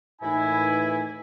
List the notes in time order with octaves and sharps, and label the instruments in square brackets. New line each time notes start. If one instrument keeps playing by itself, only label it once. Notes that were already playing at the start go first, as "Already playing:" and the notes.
[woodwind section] D#2 E3 E4 [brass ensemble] A2 D#4 G#5